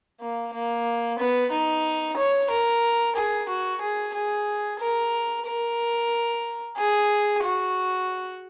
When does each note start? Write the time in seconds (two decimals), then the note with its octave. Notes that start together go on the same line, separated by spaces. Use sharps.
0.20 A#3
0.53 A#3
1.19 B3
1.52 D#4
2.17 C#5
2.50 A#4
3.16 G#4
3.49 F#4
3.81 G#4
4.14 G#4
4.80 A#4
5.46 A#4
6.77 G#4
7.43 F#4